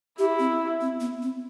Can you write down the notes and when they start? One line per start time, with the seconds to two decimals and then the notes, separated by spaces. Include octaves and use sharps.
0.19 E4 G4
0.39 C4
0.81 C4
1.00 B3
1.22 C4